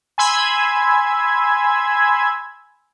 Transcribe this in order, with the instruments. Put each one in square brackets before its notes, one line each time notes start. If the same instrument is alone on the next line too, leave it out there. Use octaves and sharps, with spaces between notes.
[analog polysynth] G#5 B5 C6 E6 G#6